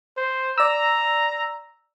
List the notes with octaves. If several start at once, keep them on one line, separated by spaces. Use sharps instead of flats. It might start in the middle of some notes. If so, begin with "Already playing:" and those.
C5
D5 A#5 E6